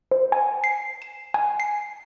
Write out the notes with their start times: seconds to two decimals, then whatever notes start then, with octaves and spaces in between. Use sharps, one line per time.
0.11 C5
0.32 G#5
0.64 C7
1.02 E7
1.34 G#5
1.60 C7